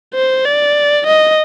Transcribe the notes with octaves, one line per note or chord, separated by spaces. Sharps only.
C5
D5
D#5